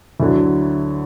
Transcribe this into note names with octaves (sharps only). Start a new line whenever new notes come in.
D2 D3 F#3 E4